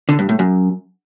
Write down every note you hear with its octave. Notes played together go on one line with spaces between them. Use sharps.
D3
G2
A2
F#2